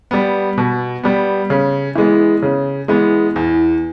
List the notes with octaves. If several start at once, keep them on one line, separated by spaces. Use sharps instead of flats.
G3 B3
B2
G3 B3
C#3
E3 G#3 B3
C#3
E3 G#3 B3
E2